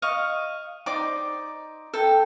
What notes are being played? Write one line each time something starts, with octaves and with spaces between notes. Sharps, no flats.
D#5 F5 C#6
D#4 C5 D5 D6
A4 G5